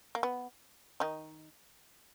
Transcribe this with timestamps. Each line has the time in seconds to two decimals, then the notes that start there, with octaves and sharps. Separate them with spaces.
0.15 A#3
0.23 B3
1.00 D#3 D#4